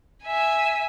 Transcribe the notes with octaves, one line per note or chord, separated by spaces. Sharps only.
E5 G#5